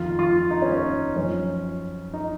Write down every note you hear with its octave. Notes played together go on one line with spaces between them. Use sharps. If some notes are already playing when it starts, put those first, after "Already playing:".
Already playing: F2 D#3 F4
F4
D#4
C#4
C#4
F#2 F3 C#4
D#4